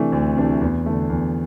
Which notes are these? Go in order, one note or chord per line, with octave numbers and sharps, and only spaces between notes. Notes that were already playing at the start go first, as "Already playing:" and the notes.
Already playing: C3 E3 A3 D4
D2
C3 E3 A3 D4
E2
D3 A3
E2